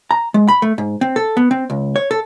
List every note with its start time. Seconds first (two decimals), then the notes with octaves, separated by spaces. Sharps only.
0.11 A#5
0.34 G#3
0.49 B5
0.62 A3
0.78 G#2
1.01 C4
1.16 A4
1.37 B3
1.51 C4
1.70 C#2
1.96 C#5
2.11 A4